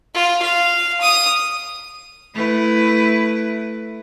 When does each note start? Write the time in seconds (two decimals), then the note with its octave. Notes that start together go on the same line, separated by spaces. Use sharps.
0.14 F4
0.42 F5
1.01 D#6
2.35 A3 E4 B4